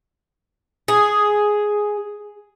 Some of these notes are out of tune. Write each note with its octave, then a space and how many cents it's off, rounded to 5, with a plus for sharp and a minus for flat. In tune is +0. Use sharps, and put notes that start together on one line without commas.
G#4 +5